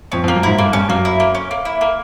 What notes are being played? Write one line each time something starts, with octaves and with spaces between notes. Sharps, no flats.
F2 C#4
F2
A#3
F#2
G#2 E4
G2 A#3
G2 C#4
F#2 A#3
E4
A#3
C#4
A#3
E4
A#3